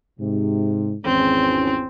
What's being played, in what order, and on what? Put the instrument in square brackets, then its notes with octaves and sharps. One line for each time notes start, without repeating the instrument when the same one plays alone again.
[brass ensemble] G#2 C3
[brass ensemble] G#1 E2 C#4 [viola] C4